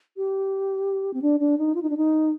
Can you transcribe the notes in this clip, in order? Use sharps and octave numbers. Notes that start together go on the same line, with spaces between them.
G4
C4
D4
D4
D#4
F4
D#4
D4
D#4